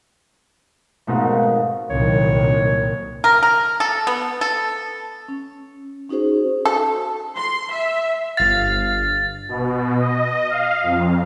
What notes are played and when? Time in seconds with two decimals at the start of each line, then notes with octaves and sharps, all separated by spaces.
1.07 G#2 B2 D#3 F3 A3 C4
1.90 C2 A#2 D#3 F#3 C#5
3.24 A#4
3.43 A#4
3.80 A4
4.07 B3
4.41 A4
5.28 C#4
6.10 C#4 D#4 F#4 G#4 C5
6.65 A4
7.36 C6
7.72 E5
8.37 G1 F5 A6
9.49 B2
9.99 D#5
10.50 F5
10.83 F2